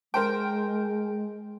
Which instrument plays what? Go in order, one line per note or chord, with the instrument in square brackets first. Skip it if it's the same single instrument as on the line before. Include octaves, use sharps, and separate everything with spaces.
[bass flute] G#3 [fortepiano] A#4 C5 G5